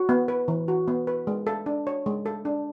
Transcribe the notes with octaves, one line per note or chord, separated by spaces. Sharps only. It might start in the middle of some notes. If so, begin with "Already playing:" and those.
Already playing: F#4
B3
B4
E3
F#4
B3
B4
G#3
A4
D4
C#5
G#3
A4
D4